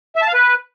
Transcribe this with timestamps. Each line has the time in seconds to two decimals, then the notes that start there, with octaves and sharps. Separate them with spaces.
0.16 E5
0.22 A5
0.28 F5
0.34 B4